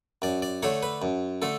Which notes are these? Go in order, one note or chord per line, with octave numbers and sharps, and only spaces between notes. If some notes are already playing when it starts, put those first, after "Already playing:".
F#2 D5
D5
D3 A3 D4 C#5
B4
F#2
D3 A3 A4